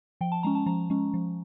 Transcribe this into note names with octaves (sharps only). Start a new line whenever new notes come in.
F3 G5
A5
G#3 C#4 A#5
A5
F3 A#5
G#3 C#4
F3